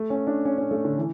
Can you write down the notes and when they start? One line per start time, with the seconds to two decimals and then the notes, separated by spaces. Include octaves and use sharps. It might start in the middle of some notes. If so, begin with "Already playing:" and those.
Already playing: A3
0.10 C#4
0.27 D4
0.45 C#4
0.58 C#4
0.71 A3
0.85 D3
0.98 E3